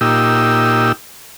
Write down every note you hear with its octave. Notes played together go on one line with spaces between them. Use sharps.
A#2 D#4 G4 E6